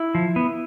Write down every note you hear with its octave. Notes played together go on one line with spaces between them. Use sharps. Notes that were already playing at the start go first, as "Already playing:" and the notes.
Already playing: E4
F3
B3